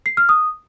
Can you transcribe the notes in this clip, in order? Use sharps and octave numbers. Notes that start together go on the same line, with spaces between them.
C7
F6
D#6